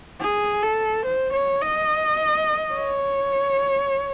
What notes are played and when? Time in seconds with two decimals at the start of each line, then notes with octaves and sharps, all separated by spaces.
0.21 G#4
0.63 A4
1.05 C5
1.33 C#5
1.61 D#5
2.73 C#5